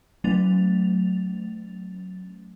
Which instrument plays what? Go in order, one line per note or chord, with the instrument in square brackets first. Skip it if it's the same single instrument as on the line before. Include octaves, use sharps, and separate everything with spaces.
[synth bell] F#3 A3 C#4 A6 F7